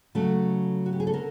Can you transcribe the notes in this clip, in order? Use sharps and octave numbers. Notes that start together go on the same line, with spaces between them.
C#3 F#3 A3 A4
F#4
G4
G#4
A4
D3 A#4